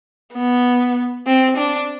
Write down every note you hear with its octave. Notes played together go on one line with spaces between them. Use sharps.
B3
C4
D4